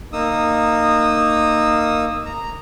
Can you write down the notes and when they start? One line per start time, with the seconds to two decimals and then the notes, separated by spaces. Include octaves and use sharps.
0.13 A#3 D#4 D#6 E6
2.25 A#5